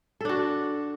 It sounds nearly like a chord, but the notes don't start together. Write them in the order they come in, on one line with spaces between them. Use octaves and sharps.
A4 D4 F#4